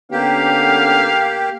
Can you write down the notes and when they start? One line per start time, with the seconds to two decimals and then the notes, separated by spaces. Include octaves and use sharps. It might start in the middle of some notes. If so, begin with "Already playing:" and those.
0.12 D3 A#3 B3 C#4 G4 F5